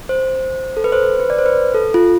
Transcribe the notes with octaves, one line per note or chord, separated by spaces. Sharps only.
C5
A4
B4
C5
B4
D5
C5
B4
A4
F4